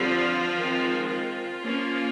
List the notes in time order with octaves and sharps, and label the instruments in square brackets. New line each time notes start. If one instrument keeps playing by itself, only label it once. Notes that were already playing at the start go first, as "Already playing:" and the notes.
Already playing: [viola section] D3 F3 G3 C4 F4
D#3 G#3 C4
F3 F4
F3 A#3 C#4